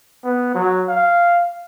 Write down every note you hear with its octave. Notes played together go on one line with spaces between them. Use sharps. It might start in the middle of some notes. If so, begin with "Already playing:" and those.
B3
F#3
F5